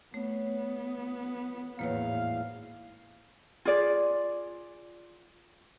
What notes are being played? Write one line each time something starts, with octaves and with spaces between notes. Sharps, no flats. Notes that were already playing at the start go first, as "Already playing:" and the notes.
A3 B3 C#5
G#1 E2 A2 A#3 B4 C#5 F5
F4 G#4 D5